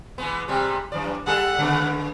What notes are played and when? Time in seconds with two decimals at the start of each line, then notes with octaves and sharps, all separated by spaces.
0.18 E3 G#3 B3
0.48 C3 G3 G#3
0.92 F#2 E3 D5
1.27 G3 G#4 A4 F#5
1.59 C#3 G#3 B3